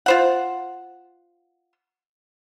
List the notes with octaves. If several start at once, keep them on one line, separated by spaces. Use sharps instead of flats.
F4 C5 F#5